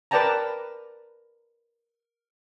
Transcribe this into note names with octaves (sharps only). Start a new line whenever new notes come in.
A#4 B4 D5 G5 A5 A#5